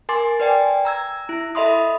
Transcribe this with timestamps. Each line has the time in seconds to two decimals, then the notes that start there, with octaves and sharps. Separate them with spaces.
0.09 A#4 G#5 C6 D6 A6
0.40 B4 D5 G5 G#5
0.85 A#5 E6 G#6
1.29 E4
1.55 A4 D#5 E5 B5 C6 D#6